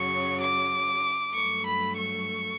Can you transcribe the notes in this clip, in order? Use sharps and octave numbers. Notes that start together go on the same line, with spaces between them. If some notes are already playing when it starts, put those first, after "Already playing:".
Already playing: F#2 C#3 F#3 C#6
D6
G2 F#3 A3 C#6
B5
C#6